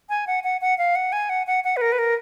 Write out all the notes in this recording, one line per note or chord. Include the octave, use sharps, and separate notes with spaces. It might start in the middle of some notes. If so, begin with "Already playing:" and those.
G#5
F#5
F#5
F#5
F5
F#5
G#5
F#5
F#5
F#5
B4
A#4
B4
A#4